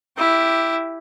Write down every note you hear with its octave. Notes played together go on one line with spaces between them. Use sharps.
E4 G4